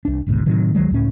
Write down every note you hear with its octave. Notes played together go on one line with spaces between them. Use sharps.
C2 D4
G#1 D2 G#2 B2
A2 C3 D#3 F#3
C#2 D#3 F#3 G#3
C#2 A2 C#4